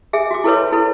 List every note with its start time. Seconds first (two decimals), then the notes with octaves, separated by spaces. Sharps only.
0.13 G#4 E5 G#5
0.31 F#4 D6
0.44 E4 A4 B4 C#5
0.72 E4 A4 B4